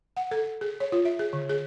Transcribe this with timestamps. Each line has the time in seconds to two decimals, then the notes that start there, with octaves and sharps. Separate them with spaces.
0.17 F#5
0.31 A4
0.61 G#4
0.80 C#5
0.92 F4
1.05 E5
1.19 G#4
1.33 D3
1.49 G#4